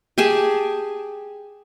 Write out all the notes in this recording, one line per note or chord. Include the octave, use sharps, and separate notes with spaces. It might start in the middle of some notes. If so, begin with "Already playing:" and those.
G4 G#4 G#5 A5